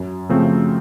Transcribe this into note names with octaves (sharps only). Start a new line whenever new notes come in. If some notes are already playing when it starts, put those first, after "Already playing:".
Already playing: F#2
C#3 F3 A3 C4